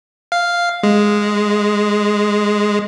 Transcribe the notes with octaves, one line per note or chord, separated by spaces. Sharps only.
F5
G#3